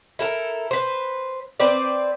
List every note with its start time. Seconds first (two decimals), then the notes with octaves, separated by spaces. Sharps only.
0.19 E4 A4 A#4
0.71 B4 C5
1.60 C4 B4 C5 D5